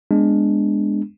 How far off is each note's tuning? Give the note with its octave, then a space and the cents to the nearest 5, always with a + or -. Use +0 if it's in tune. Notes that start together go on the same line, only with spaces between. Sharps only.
G#3 +0 B3 +0 D4 +0